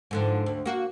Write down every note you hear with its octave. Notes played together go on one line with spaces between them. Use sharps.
G#2 D3 F3
D2
A#3 F#4